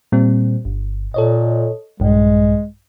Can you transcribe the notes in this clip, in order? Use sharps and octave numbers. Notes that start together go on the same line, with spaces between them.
A#2 G3 C4
G1
A#2 A4 C#5 D#5
A#1 G2 G#3